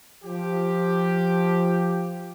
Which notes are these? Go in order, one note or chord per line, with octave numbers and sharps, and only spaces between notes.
F3 G4